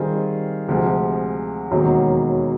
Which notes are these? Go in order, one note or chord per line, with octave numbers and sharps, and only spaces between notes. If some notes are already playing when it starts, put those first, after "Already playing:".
Already playing: D#3 G3 C4 F4 G#4
D2 C3 F3 G#3
E1 D#2 D#3 F#3